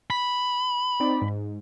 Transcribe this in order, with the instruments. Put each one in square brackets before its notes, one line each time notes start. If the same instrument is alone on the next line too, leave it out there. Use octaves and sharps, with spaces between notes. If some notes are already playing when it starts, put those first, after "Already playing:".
[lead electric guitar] B5
[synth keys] C4 D#4 D5
G#2